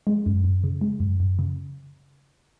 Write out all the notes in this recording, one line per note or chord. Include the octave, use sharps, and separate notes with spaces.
G#3
F#2
F#2
C#3
G#3
F#2
F#2
C#3